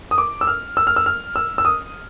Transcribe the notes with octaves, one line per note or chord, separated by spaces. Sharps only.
D#6
D6
E6
F6
E6
F6
E6
F6
E6
E6
D#6